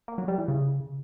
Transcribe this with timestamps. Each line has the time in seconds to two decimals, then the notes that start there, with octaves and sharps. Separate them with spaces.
0.08 A#3
0.18 F#3
0.28 G3
0.38 E3
0.48 C#3